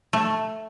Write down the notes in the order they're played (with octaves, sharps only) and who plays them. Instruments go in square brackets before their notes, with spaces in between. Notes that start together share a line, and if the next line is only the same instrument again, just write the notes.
[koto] A3